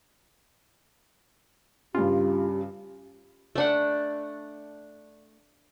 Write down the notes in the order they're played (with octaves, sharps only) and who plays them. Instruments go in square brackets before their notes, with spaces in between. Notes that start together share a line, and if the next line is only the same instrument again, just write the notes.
[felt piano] G2 C#3 [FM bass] F4 [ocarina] G4
[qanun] A3 D4 F#5